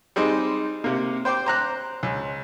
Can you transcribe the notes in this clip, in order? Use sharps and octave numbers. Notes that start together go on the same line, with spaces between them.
G3 G#3 C4 D#4
C3 A#3
C5 G5 C6 D6
C5 A#5 F#6
C#2